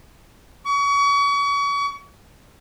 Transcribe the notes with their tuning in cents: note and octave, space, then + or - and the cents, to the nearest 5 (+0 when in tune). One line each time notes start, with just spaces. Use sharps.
C#6 +35